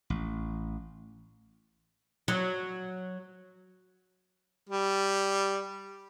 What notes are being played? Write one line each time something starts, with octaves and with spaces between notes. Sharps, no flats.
A1
F#3
G3